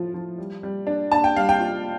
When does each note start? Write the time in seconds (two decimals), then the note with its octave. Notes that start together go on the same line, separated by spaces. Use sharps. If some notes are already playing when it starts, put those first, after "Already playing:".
Already playing: A2 F3 F4
0.14 F3
0.38 G3
0.63 G3
0.87 D4
1.12 D4 A5
1.24 G5
1.36 G3 F5
1.49 G5
1.60 F4